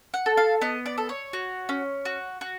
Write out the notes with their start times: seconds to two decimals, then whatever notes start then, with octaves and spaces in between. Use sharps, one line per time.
0.14 F#5
0.26 A4
0.37 F5
0.61 B3 D#5
0.86 D5
0.98 A4
1.09 C#5
1.33 F#4
1.69 C#4
2.05 F#4
2.41 F#4